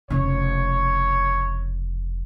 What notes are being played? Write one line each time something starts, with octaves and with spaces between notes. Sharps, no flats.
F1 C#3 C#5